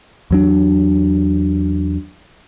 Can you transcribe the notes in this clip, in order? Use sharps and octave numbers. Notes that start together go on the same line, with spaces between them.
E2 F#3 D4